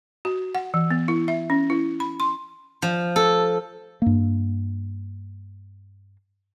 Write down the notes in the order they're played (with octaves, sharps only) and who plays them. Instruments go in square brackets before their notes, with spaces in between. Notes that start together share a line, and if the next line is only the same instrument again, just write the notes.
[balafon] F#4
F#5
E3
B3
E4
E5
C#4
E4
B5
C6
[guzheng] F3
A4
[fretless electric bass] G2 A#3